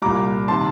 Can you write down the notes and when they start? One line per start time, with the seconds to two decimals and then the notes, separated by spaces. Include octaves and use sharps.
0.02 C2 A#2 G3 A#5 D6
0.48 C3 D#3 A5 C6